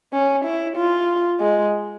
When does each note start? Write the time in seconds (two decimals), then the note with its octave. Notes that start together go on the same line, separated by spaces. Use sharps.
0.13 C#4
0.45 E4
0.77 F4
1.41 G#3